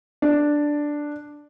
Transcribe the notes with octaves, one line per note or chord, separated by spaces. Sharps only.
D4